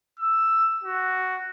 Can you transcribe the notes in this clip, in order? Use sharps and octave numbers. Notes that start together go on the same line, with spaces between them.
E6
F#4